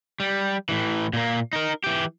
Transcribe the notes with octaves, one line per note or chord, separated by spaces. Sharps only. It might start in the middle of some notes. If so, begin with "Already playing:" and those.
G3
A2 E3
A#2 A#3
D#4 A#4
E3 G4